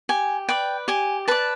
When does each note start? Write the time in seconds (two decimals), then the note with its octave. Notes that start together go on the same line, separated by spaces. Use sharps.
0.09 G4 G#5
0.48 B4 D5 G5
0.88 G4 G#5
1.28 B4 D5 A5